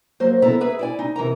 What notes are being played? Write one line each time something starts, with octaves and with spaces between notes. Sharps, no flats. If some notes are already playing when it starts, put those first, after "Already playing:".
F#3 A#3 C5
F3 B3 E4 A4 E5 A#5
G#4 B4 E5
E4 D5 G#5
D#4
C3 E3 A#4 A#5